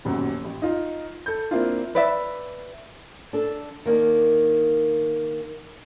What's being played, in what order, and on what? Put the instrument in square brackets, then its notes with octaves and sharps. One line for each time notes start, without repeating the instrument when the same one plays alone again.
[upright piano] D#1 B1 F#2
A1
D#4 F4
A4 G6
A#3 C4 D4 E4 F4
[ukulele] B4 D5 E5
[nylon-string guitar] D4 A4
D#3 A#3 D4 D#4